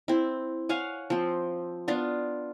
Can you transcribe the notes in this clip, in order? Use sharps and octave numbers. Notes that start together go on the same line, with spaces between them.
C4 E4
C#5 F5 F#5 G#5
F3 C4
B3 D4 F4